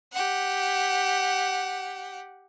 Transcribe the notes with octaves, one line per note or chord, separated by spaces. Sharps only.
G4 F#5